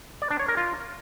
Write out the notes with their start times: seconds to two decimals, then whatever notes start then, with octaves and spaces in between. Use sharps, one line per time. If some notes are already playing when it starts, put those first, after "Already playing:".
0.22 D5
0.31 D4
0.39 C#5
0.48 A#4
0.57 F4